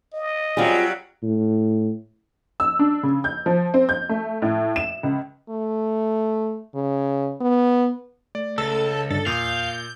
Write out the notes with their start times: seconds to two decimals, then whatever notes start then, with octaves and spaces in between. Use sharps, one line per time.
0.13 D#5
0.57 F#3 G3 C4 F4 G#4
1.23 A2
2.60 E6
2.79 D4
3.03 C#3
3.24 G6
3.46 F3
3.74 C4
3.89 G6
4.09 A3
4.42 A2
4.76 E7
5.03 C#2
5.50 A3
6.75 C#3
7.41 B3
8.35 A3 D5
8.58 C#2 A4 E6
9.10 G2 D3 D4 A4
9.26 E2 A#2 F5 D#6 G6